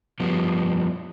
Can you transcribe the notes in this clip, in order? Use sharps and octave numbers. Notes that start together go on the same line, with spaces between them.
F3 G3 B3